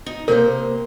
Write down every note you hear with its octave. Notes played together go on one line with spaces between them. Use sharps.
D#4
C3 A#3 A#4 C5